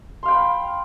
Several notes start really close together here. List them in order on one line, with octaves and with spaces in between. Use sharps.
C6 F5 G5 B5